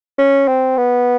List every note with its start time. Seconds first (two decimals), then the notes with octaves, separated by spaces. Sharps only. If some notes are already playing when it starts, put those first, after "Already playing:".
0.18 C#4
0.48 C4
0.77 B3